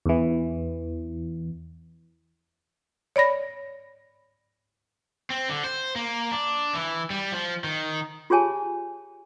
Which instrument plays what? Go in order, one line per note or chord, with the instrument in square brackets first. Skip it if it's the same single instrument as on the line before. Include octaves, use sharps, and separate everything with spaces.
[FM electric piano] E2 E3
[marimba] C#5 D5 B5 A#6
[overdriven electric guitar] C4
D3
C5
A#3
D4
E3
G3
F3
D#3
[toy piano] F4 G4 G#4 C#5 G#5 A5